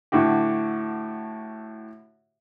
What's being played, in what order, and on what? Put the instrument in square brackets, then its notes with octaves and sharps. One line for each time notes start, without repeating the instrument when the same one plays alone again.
[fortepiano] A2 D3 F#4 G4